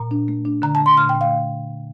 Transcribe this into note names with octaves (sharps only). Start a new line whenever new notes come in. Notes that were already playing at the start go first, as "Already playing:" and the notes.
Already playing: A#2 A#5
D4
A3
D4
D3 A#5
A5
A3
C6
A#2 F6
G5
A3
F5